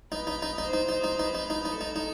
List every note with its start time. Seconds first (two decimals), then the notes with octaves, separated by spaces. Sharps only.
0.11 D#4 B4
0.27 D#4
0.42 D#4
0.58 D#4
0.65 C5
0.73 D#4
0.89 D#4
1.04 D#4
1.18 D#4 B4
1.35 D#4
1.50 D#4
1.65 D#4
1.72 A4
1.81 D#4
1.96 D#4